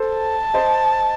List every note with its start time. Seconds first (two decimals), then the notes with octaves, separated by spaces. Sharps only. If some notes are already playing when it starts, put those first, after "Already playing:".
Already playing: A4 C5
0.09 A5
0.54 C5 D#5